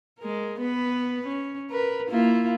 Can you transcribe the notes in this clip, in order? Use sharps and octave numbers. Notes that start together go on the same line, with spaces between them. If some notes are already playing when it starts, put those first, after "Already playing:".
G#3 A#4
B3 B4
C#4
A#4 B4
A#3 E4 F4